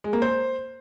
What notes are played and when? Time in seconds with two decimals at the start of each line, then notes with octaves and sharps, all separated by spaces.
0.04 G#3
0.13 A#3
0.22 C5